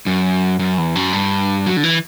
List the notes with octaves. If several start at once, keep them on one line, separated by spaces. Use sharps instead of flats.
F#2
F#2
E2
F#2
G2
F#3
D3
E3